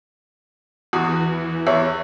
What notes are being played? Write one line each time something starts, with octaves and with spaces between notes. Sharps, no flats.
E2 E3 F#4 D#6
E2 C#5 E5